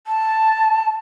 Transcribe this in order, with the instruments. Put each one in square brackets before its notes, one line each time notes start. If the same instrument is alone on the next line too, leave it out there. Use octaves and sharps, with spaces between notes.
[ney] A5